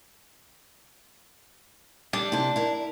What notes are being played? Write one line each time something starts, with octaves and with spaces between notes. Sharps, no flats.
G3 D4
C3 E4 A4
E4 A#4